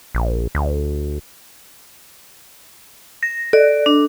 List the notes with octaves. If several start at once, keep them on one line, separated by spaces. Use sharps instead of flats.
A#1
D2
A#6
A4 D5
D4